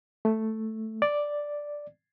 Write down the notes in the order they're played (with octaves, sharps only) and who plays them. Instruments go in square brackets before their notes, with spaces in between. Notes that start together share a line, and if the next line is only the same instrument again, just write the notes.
[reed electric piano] A3
D5